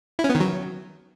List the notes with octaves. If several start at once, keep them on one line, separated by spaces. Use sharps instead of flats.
E4
C#4
B3
D#3
F#3